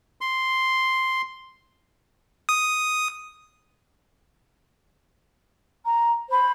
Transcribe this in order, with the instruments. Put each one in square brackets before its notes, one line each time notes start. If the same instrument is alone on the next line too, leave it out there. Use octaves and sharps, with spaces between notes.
[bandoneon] C6
[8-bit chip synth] D#6
[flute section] A#5
C5 B5